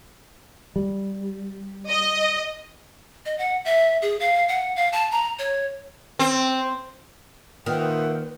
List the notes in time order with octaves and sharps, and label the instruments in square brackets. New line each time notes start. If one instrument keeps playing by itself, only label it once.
[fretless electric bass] G3
[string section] D#5
[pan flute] D#5
F#5
E5
G#4
F5
F#5
F5
A5
A#5
C#5
[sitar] C4
[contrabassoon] A#2 [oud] D#3 [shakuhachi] B4 [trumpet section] C5 E5 F#5